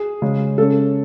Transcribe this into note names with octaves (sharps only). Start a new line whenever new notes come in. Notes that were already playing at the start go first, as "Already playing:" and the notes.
Already playing: G#4
C#3 G#3 C#4
C#3 G#3 C#4 A4